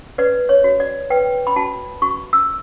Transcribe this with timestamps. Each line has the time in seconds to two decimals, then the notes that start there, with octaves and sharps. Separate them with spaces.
0.18 B4 D5
0.49 C#5
0.64 F#4
0.80 D5
1.10 B4 G5
1.47 B5
1.56 F#4 A5
2.02 F#4 C#6
2.33 E6